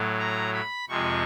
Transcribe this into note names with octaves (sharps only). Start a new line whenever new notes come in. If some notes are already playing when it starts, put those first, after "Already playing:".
Already playing: A2 F#3
A#5
B5
F2 C3 F3 G#3 C#6